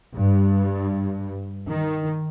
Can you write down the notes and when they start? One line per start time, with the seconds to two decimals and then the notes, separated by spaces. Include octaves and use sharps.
0.15 G2
1.68 D#3